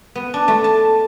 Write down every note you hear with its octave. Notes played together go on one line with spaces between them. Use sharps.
B3
D4
A3
A5